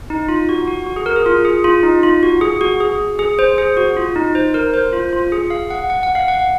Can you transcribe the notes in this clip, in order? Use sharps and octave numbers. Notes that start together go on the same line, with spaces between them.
D#4
F4
F#4
F#4
F#4
G#4
A#4
G#4
F4
G#4
F4
D#4
F4
F#4
G#4
F#4
G#4
G#4
C5
G#4
F#4
F4
D#4
C5
A#4
C5
F4
F4
G#4
F5
F#5
F#5
F#5
F5
F#5